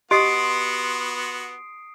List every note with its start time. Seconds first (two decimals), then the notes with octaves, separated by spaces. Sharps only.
0.11 B3 F#4 G4 D#5 C6 D#6 C7 D7